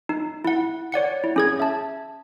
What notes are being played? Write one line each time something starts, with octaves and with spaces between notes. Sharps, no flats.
D#4
E4 F#5
C#5 D5 F#5 C#7
E4
C#4 G#4 G#6
E5 A5